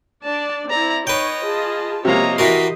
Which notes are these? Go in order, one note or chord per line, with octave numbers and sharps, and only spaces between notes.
D4 D5 A5
C4 E4 D5 A#5
D#4 B4 C#5 D#5 G5
F4 G#4 A5
C3 F3 A#3 G4 C#5 D#5 A#5
E3 F#4 A#4 C6 B6